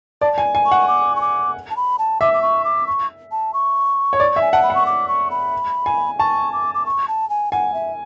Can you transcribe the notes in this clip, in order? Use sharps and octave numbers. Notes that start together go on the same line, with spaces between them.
D5 A5
G#5
G#5
C#6
F#5
D6
C#6
D6
A5
B5
A5
E5 D6
D6
C#6
D6
C#6
A5
C#6
C#5
D5
E5
G#5
F#5 A5
B5
F#5
C#6
D6
C#6
B5
G#5
A5 C#6
D6
D6
C#6
A5
G#5
F#5 G#5
E5